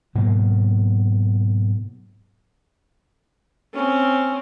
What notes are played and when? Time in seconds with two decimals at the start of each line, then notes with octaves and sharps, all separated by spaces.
0.15 G#2 B2 F#3 A#3
3.73 C4 C#4